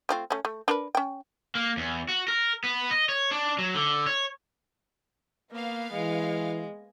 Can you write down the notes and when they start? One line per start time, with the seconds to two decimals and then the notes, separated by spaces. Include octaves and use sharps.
0.09 A3 C4 F4
0.30 A3 C#4
0.45 A3
0.68 D4 A#4 B4
0.95 C#4 G5
1.55 A#3
1.77 E2
2.09 F#4
2.28 A#4
2.64 B3
2.91 D#5
3.09 C#5
3.31 D4
3.59 F#3
3.75 D3
4.06 C#5
5.52 A#3 B3 F5
5.92 E3 G#3